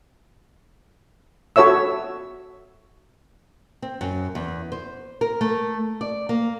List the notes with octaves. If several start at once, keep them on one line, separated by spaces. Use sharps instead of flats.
F#4 A4 C#5 E5 E6
C4
F#2
E2
C5
A#4
A3
D5
A#3